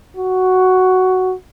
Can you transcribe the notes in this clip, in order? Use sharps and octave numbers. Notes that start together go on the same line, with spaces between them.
F#4